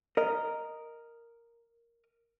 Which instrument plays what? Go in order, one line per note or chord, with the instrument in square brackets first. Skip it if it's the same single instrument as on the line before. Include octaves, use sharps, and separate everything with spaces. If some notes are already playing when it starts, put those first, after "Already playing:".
[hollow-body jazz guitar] A#4 D#5